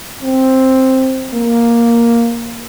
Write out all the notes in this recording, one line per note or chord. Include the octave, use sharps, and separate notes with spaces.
C4
A#3